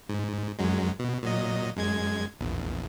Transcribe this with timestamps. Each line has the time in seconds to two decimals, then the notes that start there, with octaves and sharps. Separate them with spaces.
0.09 G#2
0.59 F#2 F#3 G#3
0.99 B2
1.23 A#2 F#3 D#5
1.76 F#2 G#3 G#6
2.40 A#1 E2